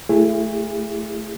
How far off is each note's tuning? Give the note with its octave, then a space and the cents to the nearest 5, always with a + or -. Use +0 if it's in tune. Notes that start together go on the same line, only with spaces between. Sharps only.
A3 +0 E4 +25 G#4 -30